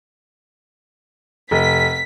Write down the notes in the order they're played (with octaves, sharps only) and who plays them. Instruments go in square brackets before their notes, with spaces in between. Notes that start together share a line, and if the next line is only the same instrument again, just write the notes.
[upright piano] F1 [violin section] B6